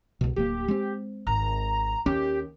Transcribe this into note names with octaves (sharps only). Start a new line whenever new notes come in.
C2 B2
D1 A#3 G4
G#3 C4
G#1 A#5
D#2 C#4 G4